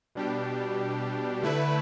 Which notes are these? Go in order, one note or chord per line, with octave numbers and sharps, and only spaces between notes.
B2 G3 D4 G4
D3 A3 E4 B4